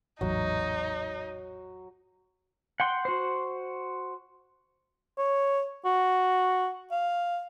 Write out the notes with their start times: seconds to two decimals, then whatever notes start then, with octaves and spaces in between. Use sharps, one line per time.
0.21 A1 E2 G#2 F#3 D#4
2.80 F#5 G5 C6
3.05 F#4 C5
5.18 C#5
5.85 F#4
6.91 F5